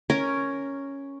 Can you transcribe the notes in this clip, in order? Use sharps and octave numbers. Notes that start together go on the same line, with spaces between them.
C#4 A#4